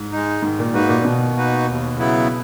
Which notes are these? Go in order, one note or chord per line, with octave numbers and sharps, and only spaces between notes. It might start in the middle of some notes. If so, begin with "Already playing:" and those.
Already playing: G#2
G#3 D#4
G#2 D#3
A#2
G#2 A#3 D#4 F#4 B4
A#2
A#2
B2 D#3
A#3 D#4 F#4 B4
D#2
C#3 F#3 B3 E4